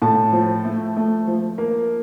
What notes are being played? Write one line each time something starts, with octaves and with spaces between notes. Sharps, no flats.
A2 A5
F3
A3
A3
F3
A#3